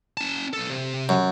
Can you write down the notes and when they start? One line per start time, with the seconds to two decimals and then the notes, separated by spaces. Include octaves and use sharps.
0.17 C#4 A5
0.53 B1 A4
0.70 C3
1.09 F#2